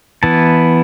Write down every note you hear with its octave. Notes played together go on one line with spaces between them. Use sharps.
E3 B3 E4 A5